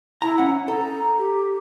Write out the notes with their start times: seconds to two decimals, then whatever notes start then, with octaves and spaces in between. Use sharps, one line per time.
0.22 E4 A#5
0.38 C#4 F#5
0.68 A4 A#5
1.18 G4